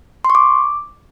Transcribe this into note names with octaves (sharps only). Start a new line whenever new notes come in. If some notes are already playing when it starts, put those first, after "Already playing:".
C6
C#6
D6